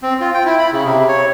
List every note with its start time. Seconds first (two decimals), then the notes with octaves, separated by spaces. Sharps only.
0.02 C4
0.20 F4
0.34 G5
0.45 E4
0.59 B5
0.73 C#3
0.84 C3
1.08 C#5